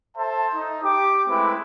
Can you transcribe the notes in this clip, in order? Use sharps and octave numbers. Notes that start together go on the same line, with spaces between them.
A4 C5 E5 A5
D#4
G4 D6
G#3 A3 C4 E4 B4